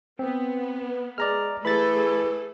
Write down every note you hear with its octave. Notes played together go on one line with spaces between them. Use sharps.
B3 C4
G#3 D5 A#5 F6
E3 A3 G#4 A4 B5 A6